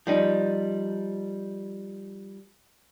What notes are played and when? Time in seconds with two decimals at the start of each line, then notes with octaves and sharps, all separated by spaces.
0.07 F3 G3 D#4